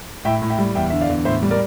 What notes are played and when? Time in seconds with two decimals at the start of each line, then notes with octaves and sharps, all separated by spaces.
0.25 A2 E5 G5
0.42 A2
0.50 E5 G5
0.59 G3
0.75 E2 E5 G5
0.90 D3 E5
1.01 D5 F5
1.09 E2
1.25 A2 C5 E5
1.42 G3
1.51 A#4 D5